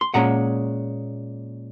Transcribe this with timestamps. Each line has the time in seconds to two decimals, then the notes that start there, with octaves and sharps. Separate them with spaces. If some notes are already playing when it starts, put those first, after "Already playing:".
0.01 C6
0.14 A#2 G#3 C#4 F#5 A#5